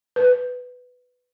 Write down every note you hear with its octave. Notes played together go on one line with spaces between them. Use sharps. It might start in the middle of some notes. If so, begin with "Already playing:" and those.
B4